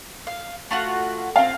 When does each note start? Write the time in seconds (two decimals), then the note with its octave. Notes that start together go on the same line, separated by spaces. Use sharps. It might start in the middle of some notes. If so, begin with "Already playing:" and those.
0.27 F5
0.71 A3 F4 F#4
1.36 C4 F4 F5